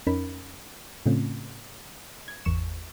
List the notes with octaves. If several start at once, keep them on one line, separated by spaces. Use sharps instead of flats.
F2 C#4 D#4 A#4 B5
A2 C#3 A3 C4 C#4 F4
G#6
G#1 E2 C#6 E7